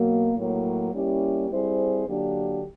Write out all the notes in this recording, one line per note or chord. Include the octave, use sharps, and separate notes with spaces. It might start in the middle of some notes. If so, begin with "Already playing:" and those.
Already playing: B2 F#3 A#3
A2 F#3 A#3
G3 A#3 C#4 E4 G4
G3 C4 E4 G#4 C5
D3 F#3 A#3 D4 G4